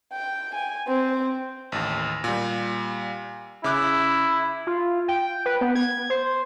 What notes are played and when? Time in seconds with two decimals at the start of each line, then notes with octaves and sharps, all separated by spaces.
0.13 G5
0.55 G#5
0.88 C4
1.72 A1 D#2
2.24 A#2 G3
3.64 C#3 E4 D6 F#6
4.67 F4
5.08 G5
5.46 B4
5.61 B3
5.75 G#6
6.10 C5